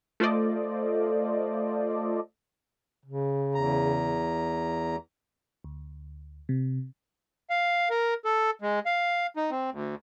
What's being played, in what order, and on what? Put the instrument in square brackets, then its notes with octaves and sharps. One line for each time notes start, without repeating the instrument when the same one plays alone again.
[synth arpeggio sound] A3 F4 A4 C5 D5 D#5
[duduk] C#3
[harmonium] E2 A#5
[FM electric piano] D2
C3
[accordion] F5
A#4
A4
G#3
F5
D#4
C4
D2